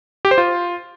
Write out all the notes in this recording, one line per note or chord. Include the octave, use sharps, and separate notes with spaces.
G4
C5
F4